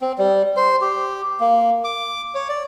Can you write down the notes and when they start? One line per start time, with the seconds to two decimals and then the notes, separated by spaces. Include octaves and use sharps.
0.01 C4
0.18 G3
0.57 C5
0.81 G4
1.40 A#3
1.84 D6
2.35 C#5
2.49 D5